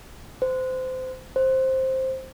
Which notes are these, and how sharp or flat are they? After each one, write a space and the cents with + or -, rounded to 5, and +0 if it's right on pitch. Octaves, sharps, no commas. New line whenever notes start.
C5 -25
C5 +5